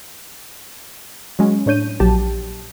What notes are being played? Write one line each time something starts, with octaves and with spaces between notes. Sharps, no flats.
F#3 G#3 C#4
A2 D4 C#5 G6 D#7
A#1 F#3 G4 A5